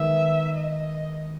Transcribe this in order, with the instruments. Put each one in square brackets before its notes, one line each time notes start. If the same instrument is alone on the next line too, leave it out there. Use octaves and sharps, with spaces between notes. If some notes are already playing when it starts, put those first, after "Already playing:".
Already playing: [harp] D#3 G#3 B3 D#4 [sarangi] E5
[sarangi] D#5